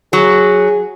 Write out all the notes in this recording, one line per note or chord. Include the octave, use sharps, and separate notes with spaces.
F#3 G#4